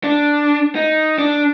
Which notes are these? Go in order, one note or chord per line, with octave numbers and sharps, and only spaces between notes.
D4
D#4
D4